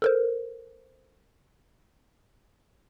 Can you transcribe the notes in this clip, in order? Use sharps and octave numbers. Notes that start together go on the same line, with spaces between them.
A4 A#4 C5